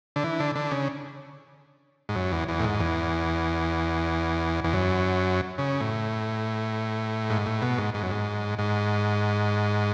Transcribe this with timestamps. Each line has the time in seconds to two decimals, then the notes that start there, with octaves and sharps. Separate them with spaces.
0.16 D3
0.24 E3
0.40 D3
0.55 D3
0.71 C#3
2.09 G#2
2.15 F#2
2.32 E2
2.48 E2
2.60 A2
2.64 G#2
2.80 E2
4.64 E2
4.73 F#2
5.58 C#3
5.81 A2
7.30 G#2
7.46 A2
7.62 B2
7.78 G#2
7.94 G#2
8.03 F#2
8.11 G#2
8.59 G#2